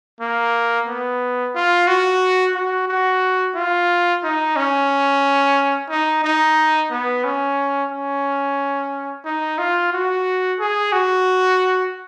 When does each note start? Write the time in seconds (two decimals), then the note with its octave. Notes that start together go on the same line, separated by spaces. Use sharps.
0.21 A#3
0.88 B3
1.55 F4
1.87 F#4
2.55 F#4
2.88 F#4
3.55 F4
4.23 D#4
4.56 C#4
5.90 D#4
6.24 D#4
6.91 B3
7.24 C#4
7.92 C#4
9.25 D#4
9.58 F4
9.93 F#4
10.60 G#4
10.92 F#4